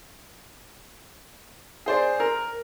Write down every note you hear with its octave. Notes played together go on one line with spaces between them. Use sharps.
G#4 C5 D5
A#4